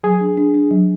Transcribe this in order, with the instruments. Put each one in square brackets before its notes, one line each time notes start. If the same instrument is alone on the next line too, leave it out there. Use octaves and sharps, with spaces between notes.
[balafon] F#3 [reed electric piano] G#4
[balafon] D4
D4
D4
F#3